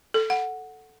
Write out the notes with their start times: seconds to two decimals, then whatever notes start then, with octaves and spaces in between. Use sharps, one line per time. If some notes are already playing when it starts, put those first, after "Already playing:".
0.14 A4
0.30 F#5